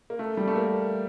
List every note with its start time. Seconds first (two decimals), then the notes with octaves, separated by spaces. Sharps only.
0.10 A#3
0.19 A3
0.37 G3
0.48 A3
0.56 A#3